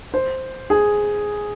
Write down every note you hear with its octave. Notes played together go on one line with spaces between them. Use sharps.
C5
G#4